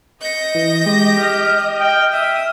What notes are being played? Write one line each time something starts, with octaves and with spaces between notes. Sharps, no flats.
D#5 G6 A#6 C#7
E3
G#3 G4
D#5 F6
G5
E5 D#6